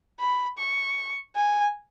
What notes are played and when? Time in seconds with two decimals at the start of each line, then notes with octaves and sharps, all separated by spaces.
0.19 B5
0.58 C#6
1.35 G#5